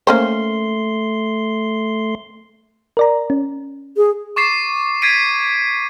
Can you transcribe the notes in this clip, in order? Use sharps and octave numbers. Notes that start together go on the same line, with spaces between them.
A3 A#3 C#4 C5 C6
A#4 D5 A#5
C#4
G#4
C#6 D6 A6 C7 E7
G#6 A6 B6 C7 D7 D#7